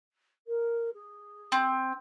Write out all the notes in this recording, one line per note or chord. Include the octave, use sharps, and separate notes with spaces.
A#4
G#4
C4